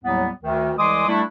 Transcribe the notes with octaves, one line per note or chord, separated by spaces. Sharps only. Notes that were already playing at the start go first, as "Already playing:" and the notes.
D#2 A2 F#3 G3 B3
D2 D#3
C2 E3 G#3 C6 D6 D#6
G3 A3 D4 E4